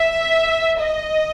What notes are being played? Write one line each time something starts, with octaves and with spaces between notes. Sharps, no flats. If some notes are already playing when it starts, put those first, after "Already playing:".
Already playing: E5
D#5